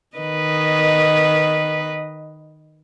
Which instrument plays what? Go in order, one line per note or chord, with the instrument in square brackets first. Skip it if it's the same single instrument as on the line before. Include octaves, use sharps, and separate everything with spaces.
[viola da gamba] D#3 B4 D#5